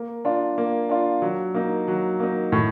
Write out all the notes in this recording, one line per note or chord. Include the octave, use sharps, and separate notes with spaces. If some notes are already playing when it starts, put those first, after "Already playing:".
Already playing: A#3
D4 F4
A#3
D4 F4
F#3
A#3 D#4
F#3
A#3 D#4
A2